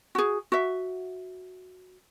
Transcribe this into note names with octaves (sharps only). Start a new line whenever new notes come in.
F#4 G#4
F#4 E5